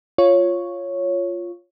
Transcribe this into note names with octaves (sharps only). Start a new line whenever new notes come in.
F4 C#5